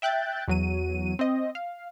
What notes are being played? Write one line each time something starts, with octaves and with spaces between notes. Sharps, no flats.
E5 G5 F#6 G6 A6
E2 F#3 D#7
C4 D#5
F5